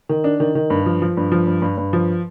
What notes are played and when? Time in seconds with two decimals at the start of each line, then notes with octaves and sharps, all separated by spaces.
0.09 D#3
0.24 D4
0.40 D#3
0.55 D#3
0.70 G2
0.86 F3
1.02 F3
1.17 G2
1.32 F3
1.47 G2
1.62 G2
1.77 G2
1.93 F3